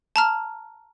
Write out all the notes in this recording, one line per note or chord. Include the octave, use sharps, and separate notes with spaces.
A5 A#5 F6